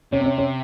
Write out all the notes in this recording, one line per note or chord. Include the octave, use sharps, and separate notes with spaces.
C3 C#4
C4
C#4
C#4